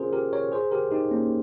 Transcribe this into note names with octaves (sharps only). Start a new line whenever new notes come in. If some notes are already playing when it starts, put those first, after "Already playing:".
Already playing: C#4 F4 G#4 A#4 C5
G4 A#4
A#4 C#5
G#4 C5
G4 A#4
D#4 G4
A#3 C#4